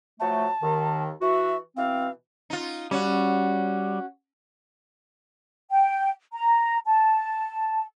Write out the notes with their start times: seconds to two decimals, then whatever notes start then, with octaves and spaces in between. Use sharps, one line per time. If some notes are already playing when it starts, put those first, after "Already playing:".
0.20 F3 F#3 A3 A5
0.63 D#2 D#3
1.22 E3 F#4 E5
1.77 B2 E3 C4 F5
2.50 D#4 F4
2.91 G3 C#4 F#4
5.71 G5
6.33 A#5
6.86 A5